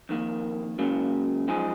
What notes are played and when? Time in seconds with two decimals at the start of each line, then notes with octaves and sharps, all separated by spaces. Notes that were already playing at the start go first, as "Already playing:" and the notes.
0.09 F2 D#3 A#3
0.78 C#2 C#3 F#3 A#3
1.48 F#2 F3 G#3 D#4 G#4